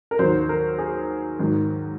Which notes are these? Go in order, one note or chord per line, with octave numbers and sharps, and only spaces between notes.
A#4
D#2 D#3 F#3 C5
A#4
G#4
G#2 D#3 F#3